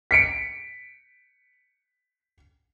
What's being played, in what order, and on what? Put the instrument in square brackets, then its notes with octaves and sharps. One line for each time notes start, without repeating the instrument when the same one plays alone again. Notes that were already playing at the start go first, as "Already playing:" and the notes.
[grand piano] B6 C#7 D7